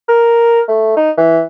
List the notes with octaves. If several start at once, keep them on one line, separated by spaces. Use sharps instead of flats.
A#4
A3
D#4
E3